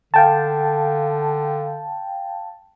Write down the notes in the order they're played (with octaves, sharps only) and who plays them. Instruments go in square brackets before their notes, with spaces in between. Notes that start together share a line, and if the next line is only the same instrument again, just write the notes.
[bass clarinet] D3 [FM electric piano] F5 G5 A5